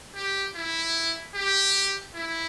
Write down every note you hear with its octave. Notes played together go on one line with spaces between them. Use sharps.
G4
E4
G4
E4